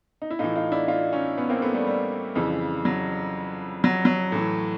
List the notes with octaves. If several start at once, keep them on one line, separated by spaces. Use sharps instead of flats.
D#4
E4
A2 E3 D#4 F4
D#4 F4
D4 E4
D#4 F4
C#4 D#4
B3 C#4
A#3 C4
A3 B3
G3 A3
G3
F2 C#3 E3
F#3
F#3
F#3
A2 E3